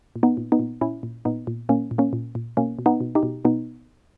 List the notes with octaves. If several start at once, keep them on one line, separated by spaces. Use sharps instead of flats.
A#2
B3 D#4
A#2
B3 D#4
A#2
A#2 C#4 E4
A#2
A#2 B3 D#4
A#2
A#2 A#3 C#4
A#2
A#3 C#4
A#2
A#2
B2 A#3 C#4
B2
B3 D#4
B2
D#4 G4
B2
B2 B3 D#4